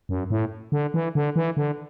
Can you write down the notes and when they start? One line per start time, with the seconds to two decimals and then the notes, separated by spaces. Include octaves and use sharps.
0.09 F#2
0.30 A2
0.72 D3
0.94 E3
1.15 D3
1.36 E3
1.57 D3